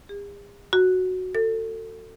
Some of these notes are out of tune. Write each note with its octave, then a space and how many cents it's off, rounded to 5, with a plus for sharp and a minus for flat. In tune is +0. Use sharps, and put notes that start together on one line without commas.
G#4 -45
F#4 -5
A4 +25